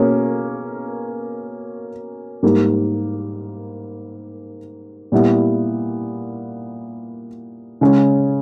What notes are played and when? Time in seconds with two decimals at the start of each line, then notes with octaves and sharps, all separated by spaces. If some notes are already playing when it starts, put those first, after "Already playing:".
Already playing: B2 A#3 C#4 G#4
2.43 G#2 G3 A#3
5.12 A#2 G3 B3 E4
7.81 C#3 G#3 C#4